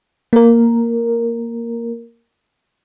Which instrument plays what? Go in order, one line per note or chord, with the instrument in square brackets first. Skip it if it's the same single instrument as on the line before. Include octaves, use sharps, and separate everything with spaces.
[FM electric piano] A#3 A#4